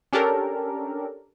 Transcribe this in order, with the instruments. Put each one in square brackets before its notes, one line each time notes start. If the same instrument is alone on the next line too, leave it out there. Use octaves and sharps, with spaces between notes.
[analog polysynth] C#4 D4 G4 A4 A#4